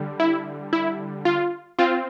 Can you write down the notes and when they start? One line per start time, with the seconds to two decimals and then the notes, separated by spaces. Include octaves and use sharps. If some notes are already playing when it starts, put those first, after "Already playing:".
Already playing: D3 G3
0.20 E4
0.73 E4
1.25 F4
1.79 C4 F4